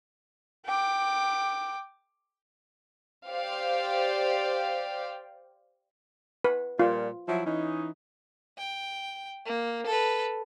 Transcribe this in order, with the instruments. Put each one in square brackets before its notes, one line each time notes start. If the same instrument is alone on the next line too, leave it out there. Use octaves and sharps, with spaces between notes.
[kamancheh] G5 D6
[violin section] G4 C5 D5 F5 G5
[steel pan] B4
[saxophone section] A#2 G3 [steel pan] F4
[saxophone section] F3 F#3 E4
E3 C#4 D#4
[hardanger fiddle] G5
A#3
A4 B4